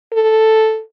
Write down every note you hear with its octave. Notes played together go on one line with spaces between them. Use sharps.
A4